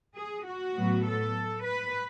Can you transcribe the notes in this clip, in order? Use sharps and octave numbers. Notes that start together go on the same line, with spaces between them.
G#4
F#4
A2 F#3 B3
A4
B4